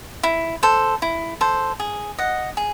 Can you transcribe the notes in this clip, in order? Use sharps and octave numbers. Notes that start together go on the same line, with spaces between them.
E4
A4 C5
E4
A4 C5
G#4
D#5 F#5
G#4